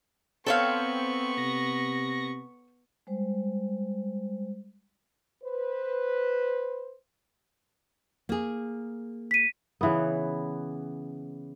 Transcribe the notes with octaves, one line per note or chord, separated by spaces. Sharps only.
B3 C4 A4 C#5 F5 C#6
C3 A#6
G3 G#3 C5
B4 C5
A#3 G#4
B6 D#7
C#3 E3 B3